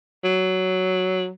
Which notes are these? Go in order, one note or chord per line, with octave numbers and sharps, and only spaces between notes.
F#3